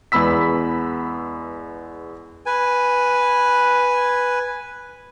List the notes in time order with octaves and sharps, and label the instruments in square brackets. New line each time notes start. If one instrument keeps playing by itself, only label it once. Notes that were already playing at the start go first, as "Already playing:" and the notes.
[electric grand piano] E2 G#3 B3 B5 E6 B6
[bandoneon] B4 G#5